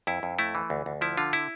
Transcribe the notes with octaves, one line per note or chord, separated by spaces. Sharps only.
F2 E4
F2
A3 E4
E3
D2
D2
F3 E4
D3 F4
E4